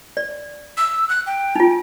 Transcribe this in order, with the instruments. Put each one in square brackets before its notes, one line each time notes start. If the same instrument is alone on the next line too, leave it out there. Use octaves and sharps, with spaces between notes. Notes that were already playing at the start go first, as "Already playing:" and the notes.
[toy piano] D5
[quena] E6
F#6
G5
[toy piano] D#4 F4